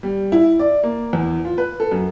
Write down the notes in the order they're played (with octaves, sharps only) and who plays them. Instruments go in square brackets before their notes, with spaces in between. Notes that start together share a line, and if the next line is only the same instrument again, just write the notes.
[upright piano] G3
E4
D5
A#3
E2
F4
B4
A4
F#2